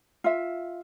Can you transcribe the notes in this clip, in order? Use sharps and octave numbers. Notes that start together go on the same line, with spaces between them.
F4 E5